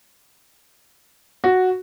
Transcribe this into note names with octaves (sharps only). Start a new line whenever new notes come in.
F#4